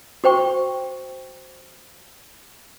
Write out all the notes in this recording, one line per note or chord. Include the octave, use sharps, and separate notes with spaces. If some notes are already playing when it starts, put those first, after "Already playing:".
F#4 C5 G5 C#6